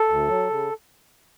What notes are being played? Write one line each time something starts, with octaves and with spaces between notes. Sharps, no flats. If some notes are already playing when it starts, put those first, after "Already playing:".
Already playing: A4
D2
F#3
C#3